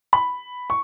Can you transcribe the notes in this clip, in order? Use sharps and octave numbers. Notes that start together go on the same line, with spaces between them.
B5
C#6